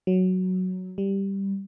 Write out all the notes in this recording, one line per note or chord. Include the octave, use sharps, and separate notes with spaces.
F#3
G3